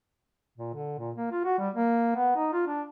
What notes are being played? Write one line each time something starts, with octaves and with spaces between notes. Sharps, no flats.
A#2
D3
A#2
A#3
F4
F#4
G3
A#3
B3
D#4
F4
D4